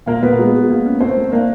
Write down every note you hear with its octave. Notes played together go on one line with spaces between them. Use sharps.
A#2 A#3 A#4
A#3 B3 B4
G#3
G#3
A#3
C#4
A3 C4 C5
A3
A#3 D4 A#4